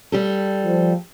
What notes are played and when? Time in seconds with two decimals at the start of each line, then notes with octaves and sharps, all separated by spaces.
0.12 G3 G4 A4
0.64 F3